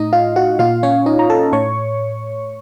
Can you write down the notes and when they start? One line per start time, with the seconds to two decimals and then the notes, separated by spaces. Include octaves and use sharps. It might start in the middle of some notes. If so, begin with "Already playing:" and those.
Already playing: A2 D#4 D#5
0.13 F4 F5
0.36 F#4 F#5
0.59 A#2 F4 F5
0.83 C#4 C#5
1.06 D#4 D#5
1.19 A#5
1.30 A4 A5
1.52 A2 C#5 C#6